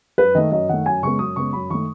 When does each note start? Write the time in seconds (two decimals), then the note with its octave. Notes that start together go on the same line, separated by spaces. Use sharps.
0.18 F#2 B4
0.35 D#3 A3 D#5
0.52 F#2 D#5
0.69 D#3 A3 F#5
0.86 F#2 G#5
1.03 C#3 G#3 B3 C#6
1.19 F#2 D#6
1.36 C#3 G#3 B3 C#6
1.53 F#2 B5
1.70 D#3 A3 C#6